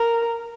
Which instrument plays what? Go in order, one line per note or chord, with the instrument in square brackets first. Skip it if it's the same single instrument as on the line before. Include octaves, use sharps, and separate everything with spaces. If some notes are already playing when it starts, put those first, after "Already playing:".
Already playing: [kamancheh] A#4